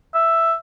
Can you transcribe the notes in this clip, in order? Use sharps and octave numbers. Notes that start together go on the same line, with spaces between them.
E5